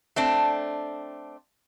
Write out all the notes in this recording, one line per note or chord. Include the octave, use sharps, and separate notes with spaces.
A3 C4 D4